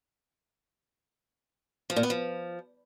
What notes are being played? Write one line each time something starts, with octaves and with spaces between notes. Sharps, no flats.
F3
A#2
B3
F3